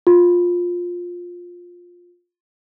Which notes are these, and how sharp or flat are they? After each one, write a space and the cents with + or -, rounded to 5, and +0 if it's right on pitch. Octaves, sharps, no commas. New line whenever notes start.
F4 +15